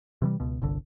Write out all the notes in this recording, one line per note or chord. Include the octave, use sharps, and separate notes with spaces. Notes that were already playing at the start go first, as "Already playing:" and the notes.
C3 E3 F#3 G3
C#2 B2
G1 C2 D3